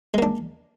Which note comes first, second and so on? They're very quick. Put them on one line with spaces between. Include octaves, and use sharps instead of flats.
G#3 A#3 D4